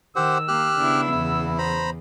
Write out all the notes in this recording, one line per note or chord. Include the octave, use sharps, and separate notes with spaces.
D#3 G4 C5 F#5 E6
A#3 G4 F6 F#6
C#3 B3 D4 E4
E2 E4
C5 A#5 B5